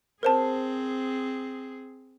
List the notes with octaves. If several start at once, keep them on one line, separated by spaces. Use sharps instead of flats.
C4 G#4 A#4 C5 A5